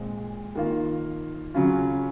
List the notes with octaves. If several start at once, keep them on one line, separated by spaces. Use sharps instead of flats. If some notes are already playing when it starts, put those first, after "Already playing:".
Already playing: A#2 G#3 C4
D#3 A#3 F4
C#3 F#3 C#4 F4